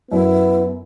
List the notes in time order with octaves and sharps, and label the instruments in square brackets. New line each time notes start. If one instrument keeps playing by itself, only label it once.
[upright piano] F#2 [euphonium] B3 [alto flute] E4